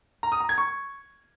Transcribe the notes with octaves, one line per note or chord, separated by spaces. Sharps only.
A#5
D#6
A#5
G#6
C#6